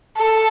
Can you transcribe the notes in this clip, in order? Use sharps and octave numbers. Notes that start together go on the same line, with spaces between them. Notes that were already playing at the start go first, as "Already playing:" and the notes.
A4